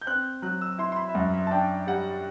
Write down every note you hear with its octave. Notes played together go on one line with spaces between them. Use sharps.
G6
C4 F#6
F#3 F#6
E6
E4 C6
C6
B5
E5
F#2 F#5
E5
A5
D4 G5
G3 F#5